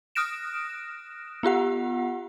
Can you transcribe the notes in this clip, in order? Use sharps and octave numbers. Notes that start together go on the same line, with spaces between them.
D#6 F6 F#6 A#6 D7 E7
B3 F4 G4 F#5